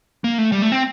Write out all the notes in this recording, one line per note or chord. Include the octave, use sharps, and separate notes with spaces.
A#3
A3
G3
A3
C4